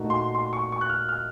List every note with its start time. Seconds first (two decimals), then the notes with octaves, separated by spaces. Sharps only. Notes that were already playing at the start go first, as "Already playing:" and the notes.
Already playing: A#2 A3 D#4 F#4
0.10 C6
0.35 C6
0.53 C#6
0.72 C#6
0.81 F#6
0.90 F6
1.09 F6